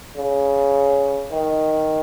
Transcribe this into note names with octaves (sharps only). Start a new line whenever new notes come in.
C#3
D#3